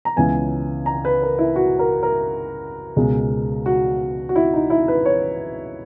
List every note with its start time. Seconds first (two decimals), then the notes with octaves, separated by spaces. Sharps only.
0.05 A#5
0.16 C#2 C#3 E3 B3 G#5
0.86 A#5
1.05 B4
1.22 A#4
1.39 E4
1.56 F#4
1.79 A#4
2.03 A#4
2.97 C#2 B2 G#3
3.66 F#4
4.29 F#4
4.36 E4
4.54 D#4
4.70 E4
4.88 B4
5.06 C#5